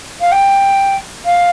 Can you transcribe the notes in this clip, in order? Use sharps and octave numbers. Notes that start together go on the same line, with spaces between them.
F5
G5
F5